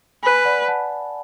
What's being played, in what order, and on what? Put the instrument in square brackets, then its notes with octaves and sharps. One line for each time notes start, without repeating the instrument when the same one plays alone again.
[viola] B4 [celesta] G#5 B5
[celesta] D5 F#5
F#5 A5